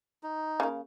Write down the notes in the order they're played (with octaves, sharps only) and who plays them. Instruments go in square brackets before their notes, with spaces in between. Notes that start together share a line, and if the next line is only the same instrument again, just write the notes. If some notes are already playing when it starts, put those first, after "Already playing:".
[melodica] D#4
[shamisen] C#3 A#3